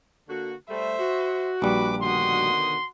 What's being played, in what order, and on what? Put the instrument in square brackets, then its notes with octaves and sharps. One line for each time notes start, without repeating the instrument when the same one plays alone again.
[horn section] D3 A#3 F#4
[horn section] G3 A3 [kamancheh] C5 E5
[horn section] F#4
[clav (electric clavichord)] A#1 G3 [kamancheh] B4 D6
[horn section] B2 D3 D#3 [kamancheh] F#4 D#6 [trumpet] C6